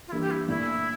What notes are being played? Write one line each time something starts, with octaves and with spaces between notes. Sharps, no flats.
F4
E3 G3 A#3 D4 E4
G4
E4
A#2 A3 D4 E4